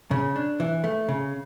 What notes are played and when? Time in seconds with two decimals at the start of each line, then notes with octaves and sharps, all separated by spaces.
0.11 C#3
0.36 D4
0.60 E3
0.84 A3
1.08 C#3